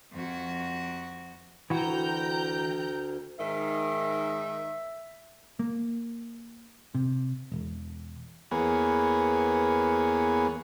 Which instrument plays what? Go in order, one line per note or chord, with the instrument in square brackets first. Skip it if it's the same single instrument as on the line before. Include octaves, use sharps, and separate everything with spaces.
[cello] F2 F#4
[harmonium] D2 [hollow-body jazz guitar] E3 F#4 [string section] G5 A#5 G6
[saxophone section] G#2 D#3 [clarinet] E5
[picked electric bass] A#3
C3
E1
[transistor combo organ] E2 A#3 B3 G#4 C#5